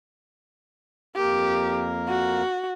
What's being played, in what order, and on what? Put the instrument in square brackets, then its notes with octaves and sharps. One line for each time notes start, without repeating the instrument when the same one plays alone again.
[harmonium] F2 A#3 A#4 [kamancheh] G4
[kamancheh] F#4